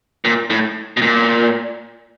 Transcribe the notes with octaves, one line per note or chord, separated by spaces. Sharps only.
A#2
A2
B2
A#2